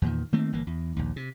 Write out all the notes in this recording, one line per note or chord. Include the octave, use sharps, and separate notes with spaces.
E2 A#2 D#3
D#3 A3 A#3 C4
G1 E3 A#3
E2
A#1 D#2
C3